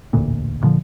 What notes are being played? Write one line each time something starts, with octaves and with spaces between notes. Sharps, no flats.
E1 A1 D2 A#2
A#2 D3 F3